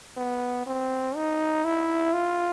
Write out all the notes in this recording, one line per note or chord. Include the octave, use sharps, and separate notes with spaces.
B3
C4
D#4
E4
F4